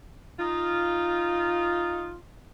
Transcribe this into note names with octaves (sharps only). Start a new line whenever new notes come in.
D#4 F4